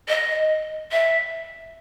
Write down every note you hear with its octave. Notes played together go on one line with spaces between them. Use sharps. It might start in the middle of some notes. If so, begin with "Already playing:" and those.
D#5
E5